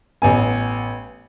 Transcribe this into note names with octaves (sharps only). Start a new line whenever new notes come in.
A1 B3 G#5